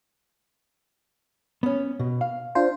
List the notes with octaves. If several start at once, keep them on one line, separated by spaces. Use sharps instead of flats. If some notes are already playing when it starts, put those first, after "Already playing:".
B3 C#4
B2
F5
D4 F4 C5